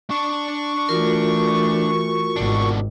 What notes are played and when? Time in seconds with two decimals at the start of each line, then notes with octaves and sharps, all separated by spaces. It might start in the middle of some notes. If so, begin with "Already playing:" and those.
0.10 D4 A5 C#6
0.89 E3 A3 F4 F#4 A#4
2.36 G#1 B2 D4